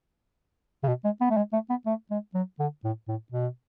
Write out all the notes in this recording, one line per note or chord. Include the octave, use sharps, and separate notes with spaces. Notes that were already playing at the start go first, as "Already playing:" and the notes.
C#3
B2
G#3
B3
A3
G#3
A3
B3
A3
G#3
F#3
D3
A2
A2
B2